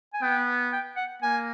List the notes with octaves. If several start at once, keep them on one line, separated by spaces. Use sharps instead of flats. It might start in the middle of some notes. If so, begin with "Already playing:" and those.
G#5
B3 G5
G5
F#5
A#3 G#5